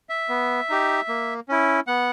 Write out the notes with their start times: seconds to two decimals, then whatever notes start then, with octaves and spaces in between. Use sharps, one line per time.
0.09 E5
0.29 B3
0.70 D#4 G4
1.09 A#3
1.49 C#4 E4
1.87 B3 F#5